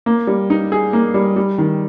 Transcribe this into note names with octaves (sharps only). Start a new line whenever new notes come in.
A#3
G3
D#4
G#4
A#3
G3
G3
D#3